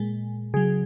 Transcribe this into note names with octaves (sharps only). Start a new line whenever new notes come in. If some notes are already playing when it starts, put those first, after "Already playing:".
Already playing: A#2 G#3
C#3 F#3 G#4